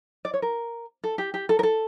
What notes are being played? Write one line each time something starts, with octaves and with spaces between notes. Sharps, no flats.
D5
C#5
A#4
A4
G4
G4
A4
A#4
A4